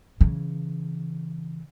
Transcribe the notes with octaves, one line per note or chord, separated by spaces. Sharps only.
C#3 E3